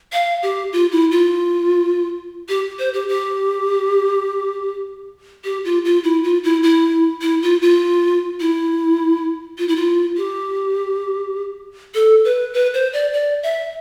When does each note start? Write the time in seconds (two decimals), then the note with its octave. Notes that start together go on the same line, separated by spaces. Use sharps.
0.13 F5
0.43 G4
0.73 F4
0.92 E4
1.11 F4
2.49 G4
2.79 C5
2.94 G4
3.09 G4
5.44 G4
5.65 F4
5.85 F4
6.04 E4
6.24 F4
6.44 E4
6.63 E4
7.22 E4
7.42 F4
7.62 F4
8.41 E4
9.58 F4
9.68 E4
9.76 F4
10.17 G4
11.95 A4
12.25 B4
12.53 B4
12.74 C5
12.93 D5
13.13 D5
13.43 E5